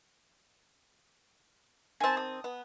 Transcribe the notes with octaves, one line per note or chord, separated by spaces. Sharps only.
D#3 C4 G#5 A5
D#6
B3